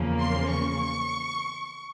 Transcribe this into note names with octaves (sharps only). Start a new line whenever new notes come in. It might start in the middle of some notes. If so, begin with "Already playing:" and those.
Already playing: E2 C#3 F3 A#3
C6
C#6